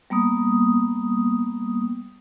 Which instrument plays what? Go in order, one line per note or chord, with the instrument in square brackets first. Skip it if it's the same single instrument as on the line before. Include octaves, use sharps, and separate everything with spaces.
[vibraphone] G3 A#3 B3 D#6